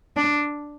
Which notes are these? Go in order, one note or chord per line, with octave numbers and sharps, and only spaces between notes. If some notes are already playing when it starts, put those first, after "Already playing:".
D4